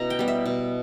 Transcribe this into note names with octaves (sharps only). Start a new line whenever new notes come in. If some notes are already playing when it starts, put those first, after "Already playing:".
Already playing: B2 C#4 E4 A#5
G5
G3 B3
E5
B2